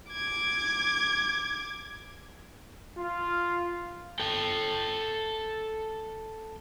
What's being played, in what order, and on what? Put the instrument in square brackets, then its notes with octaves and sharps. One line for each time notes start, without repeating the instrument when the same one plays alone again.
[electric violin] D6 G#6
[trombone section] F4
[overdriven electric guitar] A4 G5